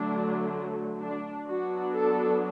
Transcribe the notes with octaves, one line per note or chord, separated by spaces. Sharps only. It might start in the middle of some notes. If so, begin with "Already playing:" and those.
Already playing: D3 F#3 A3 D4
D4
F#3 B3 D4 F#4
A4